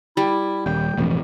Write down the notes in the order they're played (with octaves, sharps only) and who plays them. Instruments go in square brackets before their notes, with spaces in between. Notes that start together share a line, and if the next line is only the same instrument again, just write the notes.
[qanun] G3 [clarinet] E4
[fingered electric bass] D#1 [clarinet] G5
[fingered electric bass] E1 A1 F2